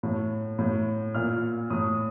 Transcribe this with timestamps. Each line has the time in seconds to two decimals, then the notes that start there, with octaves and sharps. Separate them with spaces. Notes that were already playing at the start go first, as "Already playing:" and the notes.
0.03 A2
0.59 A2
1.15 A#2 F6
1.70 A2 D#6